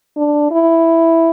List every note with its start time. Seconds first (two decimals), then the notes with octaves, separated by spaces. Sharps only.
0.17 D4
0.51 E4